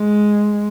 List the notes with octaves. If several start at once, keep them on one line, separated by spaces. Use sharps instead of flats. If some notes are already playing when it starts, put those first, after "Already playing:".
Already playing: G#3